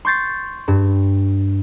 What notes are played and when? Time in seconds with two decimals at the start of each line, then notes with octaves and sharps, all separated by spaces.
0.05 C6 C#6 G6 A6 C7
0.68 G2